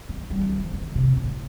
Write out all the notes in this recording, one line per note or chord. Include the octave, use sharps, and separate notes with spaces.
A#3
G3
D#3
F3
F3
D#3
C3
A2